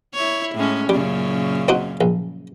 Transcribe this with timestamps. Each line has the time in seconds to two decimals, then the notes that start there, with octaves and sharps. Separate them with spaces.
0.14 E4 C#5
0.55 A2 G#3 C#4
0.89 F#2 A#2 C#3 G3
1.68 C4 D#4 F#4
2.01 A#1